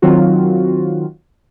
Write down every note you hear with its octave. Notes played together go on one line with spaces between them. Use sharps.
D#3 F#3 C4 F4 F#4